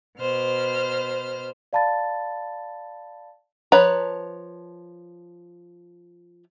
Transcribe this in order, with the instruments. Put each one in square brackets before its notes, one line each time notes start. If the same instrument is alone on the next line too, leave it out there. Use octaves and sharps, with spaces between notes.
[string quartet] B2 C5 F6
[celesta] D5 F5 A5 B5 A6
[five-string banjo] F3 B4 C#5 A#5